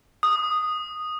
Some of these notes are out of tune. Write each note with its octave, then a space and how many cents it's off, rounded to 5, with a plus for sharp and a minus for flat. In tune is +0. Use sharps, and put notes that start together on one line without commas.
D#6 -5